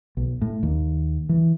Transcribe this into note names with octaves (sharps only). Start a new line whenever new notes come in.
B1
A2
D#2
E3